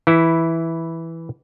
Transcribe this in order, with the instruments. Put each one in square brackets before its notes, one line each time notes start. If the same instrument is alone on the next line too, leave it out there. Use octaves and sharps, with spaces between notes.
[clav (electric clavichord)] E3 E4